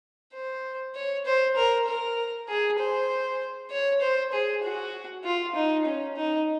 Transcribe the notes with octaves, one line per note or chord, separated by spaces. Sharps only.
C5
C#5
C5
A#4
A#4
G#4
C5
C#5
C5
G#4
F#4
F4
D#4
C#4
D#4